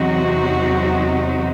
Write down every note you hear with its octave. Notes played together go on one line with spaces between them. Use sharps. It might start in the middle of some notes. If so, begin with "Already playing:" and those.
Already playing: E2 C3 F#3 C4 D#4 F#4